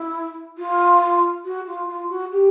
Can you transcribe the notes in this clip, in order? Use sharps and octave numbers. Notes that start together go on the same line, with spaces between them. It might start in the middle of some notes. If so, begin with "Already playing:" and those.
Already playing: E4
F4
F#4
F4
F4
F#4
G4